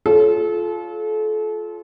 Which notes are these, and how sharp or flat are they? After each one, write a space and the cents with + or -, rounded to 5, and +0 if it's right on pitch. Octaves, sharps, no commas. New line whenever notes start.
F4 +0 A4 -35 C#5 +0